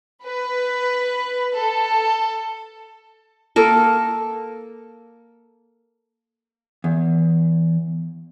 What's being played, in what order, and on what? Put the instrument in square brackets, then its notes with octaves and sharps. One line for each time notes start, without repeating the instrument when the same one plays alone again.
[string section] B4
A4
[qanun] A#3 A4 A#4
[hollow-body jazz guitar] E2